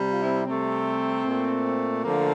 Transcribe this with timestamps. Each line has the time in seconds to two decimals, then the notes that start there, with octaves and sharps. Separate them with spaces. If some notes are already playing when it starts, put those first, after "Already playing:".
Already playing: C3 G3
0.09 F4
0.20 C4 E4
0.47 C3 G3 A3 C4
1.25 A#2 A3
2.04 D3 F3 A3 A#3